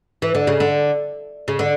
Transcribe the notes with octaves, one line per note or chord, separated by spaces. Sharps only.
E3
D3
C#3
D3
C#3
D3